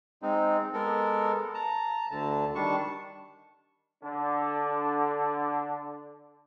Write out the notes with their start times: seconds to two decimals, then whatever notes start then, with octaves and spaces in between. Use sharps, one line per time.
0.22 G#3 C4 D#4
0.73 G#3 B3 A4 A#4
1.54 A5 A#5
2.11 D2 D3 A5
2.55 D#3 G3 D4 A5 C#6
4.03 D3 D4